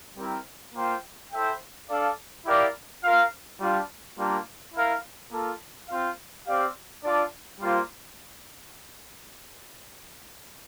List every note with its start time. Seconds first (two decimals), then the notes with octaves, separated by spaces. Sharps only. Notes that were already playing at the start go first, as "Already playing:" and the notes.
0.17 G3 C4 E4 A#4
0.75 A#3 F4 C5 G5
1.32 E4 A4 C5 E5 G5
1.89 D4 A4 D5 F5
2.46 E4 G4 A#4 D5 F5
3.03 F4 A#4 F5
3.60 G3 D4 F4
4.17 G3 A#3 D4 F4 A#4
4.74 E4 A#4 F5
5.31 A#3 F4 A4
5.89 C4 F4 C5 F5
6.46 C4 G4 D5 F5
7.03 D4 F4 A4 D5
7.60 G3 A#3 F4 C5